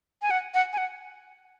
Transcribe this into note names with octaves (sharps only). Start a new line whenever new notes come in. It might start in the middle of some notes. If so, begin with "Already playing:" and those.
G#5
F#5
F#5
G#5
F#5